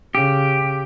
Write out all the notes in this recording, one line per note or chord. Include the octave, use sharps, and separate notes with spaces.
C#3 G4